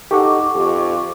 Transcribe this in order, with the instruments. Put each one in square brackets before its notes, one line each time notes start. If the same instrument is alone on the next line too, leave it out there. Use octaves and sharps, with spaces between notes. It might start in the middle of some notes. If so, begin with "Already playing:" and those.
[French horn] D#4 [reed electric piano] G4 A4 F#5 [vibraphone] C#6 D6
[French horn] F2 [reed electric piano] G4